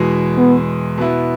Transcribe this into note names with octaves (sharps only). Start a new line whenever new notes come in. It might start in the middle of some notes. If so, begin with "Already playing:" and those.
Already playing: E2 B2 G#3
B3
B2 B3 E4